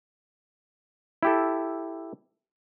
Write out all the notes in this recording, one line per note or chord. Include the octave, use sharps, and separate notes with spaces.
E4 G4 A4